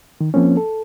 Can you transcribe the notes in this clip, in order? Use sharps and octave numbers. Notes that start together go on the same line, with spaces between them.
D#3
F3 A#3 C4 C#4
A4